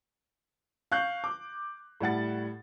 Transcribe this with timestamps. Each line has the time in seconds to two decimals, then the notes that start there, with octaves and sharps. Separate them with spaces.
0.92 F5 C#6 F#6 G6
1.24 D6
2.01 A2 G3 F#5 A6